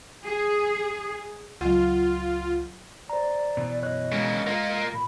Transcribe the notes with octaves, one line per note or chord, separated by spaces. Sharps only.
G#4
C#2 F#3 F4 F#5
C5 D5 A#5
B2 E3
F#2 C#5 D#5 F#6
C#3 G#3 A#3
A#3 F4 A#4
A#2 B5